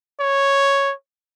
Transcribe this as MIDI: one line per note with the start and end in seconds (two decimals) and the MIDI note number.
0.20 0.93 73